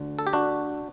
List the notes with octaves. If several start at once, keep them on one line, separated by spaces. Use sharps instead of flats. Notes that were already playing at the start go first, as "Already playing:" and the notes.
Already playing: D2 D3
A4
G4
D4 F#4